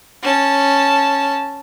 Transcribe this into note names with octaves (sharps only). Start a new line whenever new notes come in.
C#4 A5